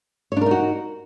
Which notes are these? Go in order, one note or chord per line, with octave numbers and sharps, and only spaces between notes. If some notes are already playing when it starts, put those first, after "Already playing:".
D4 D#4 F#4 A#4 C#5